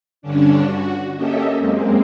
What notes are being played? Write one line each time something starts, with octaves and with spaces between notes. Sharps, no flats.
G2 D3 C#4 D4
F#4
A#3 C#4 G4 A4 D#5 E5
F#2 G#3 A#3 C4